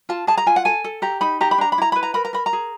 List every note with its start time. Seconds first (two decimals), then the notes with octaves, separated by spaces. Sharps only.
0.09 F4 A5
0.27 G#4 A5
0.37 A#5
0.46 F4 G#5
0.56 F#5
0.65 A4 G#5
0.84 A4
1.02 G4 A#5
1.21 D#4 B5
1.41 G4 A#5
1.51 B5
1.58 D4 A#5
1.72 B5
1.78 E4 A#5
1.92 B4 B5
2.03 A#5
2.14 A#4 B5
2.25 A#5
2.33 A#4 B5
2.46 A#5
2.53 G#4